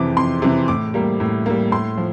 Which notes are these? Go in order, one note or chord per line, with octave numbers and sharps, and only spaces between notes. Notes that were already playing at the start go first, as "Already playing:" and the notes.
Already playing: F2 C3 E3 D6
F2 C6
C3 E3
A2 D6
G3 A#3
A2
G3 A#3
A2 C6
F3